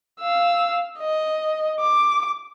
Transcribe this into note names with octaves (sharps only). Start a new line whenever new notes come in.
F5 E6
D#5
D6